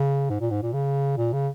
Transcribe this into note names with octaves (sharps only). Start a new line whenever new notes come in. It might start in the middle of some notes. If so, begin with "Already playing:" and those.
Already playing: C#3
G#2
A#2
G#2
A#2
C#3
A#2
C#3